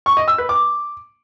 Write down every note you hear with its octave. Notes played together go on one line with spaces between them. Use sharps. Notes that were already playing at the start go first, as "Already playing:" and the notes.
C#6
D#5
E6
B4
D6